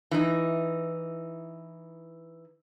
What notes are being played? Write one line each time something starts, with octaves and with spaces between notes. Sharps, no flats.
E3 D#4